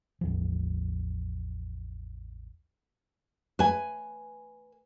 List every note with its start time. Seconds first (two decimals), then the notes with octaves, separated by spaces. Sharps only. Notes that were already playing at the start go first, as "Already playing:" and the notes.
0.21 A1 E2 F3
3.59 B4 G#5